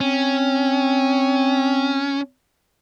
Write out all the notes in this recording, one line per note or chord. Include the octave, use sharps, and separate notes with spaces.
C4 C#4